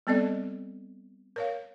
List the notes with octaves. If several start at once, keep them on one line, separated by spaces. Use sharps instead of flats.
G3 B3 C4 A4 D5 D#5
A#4 C#5 F5